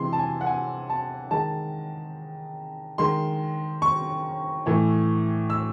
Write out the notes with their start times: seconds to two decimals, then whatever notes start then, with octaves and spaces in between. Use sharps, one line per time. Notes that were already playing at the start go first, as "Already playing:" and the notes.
Already playing: C3 E3 G#3 C6
0.13 A5
0.19 G#5
0.41 F#5
0.47 G#5
0.90 A5
1.31 D#3 G#3 A5
2.98 D#3 G#3 C6
3.82 C#6
4.66 A2 E3 A3
5.50 E6